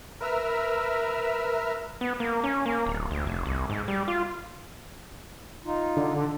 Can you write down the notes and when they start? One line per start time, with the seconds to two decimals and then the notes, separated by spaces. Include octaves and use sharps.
0.21 A#4 B4 E5 A#5 E6 F6
2.01 B3
2.20 A#3
2.44 C#4
2.66 A#3
2.87 D1
3.11 D2
3.27 F1
3.46 C2
3.69 G#2
3.88 G3
4.08 F4
5.65 D#4 F4
5.97 D3